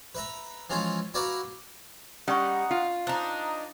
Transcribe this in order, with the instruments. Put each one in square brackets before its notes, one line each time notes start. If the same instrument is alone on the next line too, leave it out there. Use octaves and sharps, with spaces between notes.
[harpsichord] B4 E5 A#5
E3 F3 G#3 C#4 F4
E4 F#4 B4 D5 F5 A#5
[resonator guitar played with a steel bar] G3 [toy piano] C#4 D5 C#6 [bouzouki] D#4 [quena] F#5
[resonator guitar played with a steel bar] F4
[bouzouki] D4 D#4 [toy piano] C5 [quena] A#5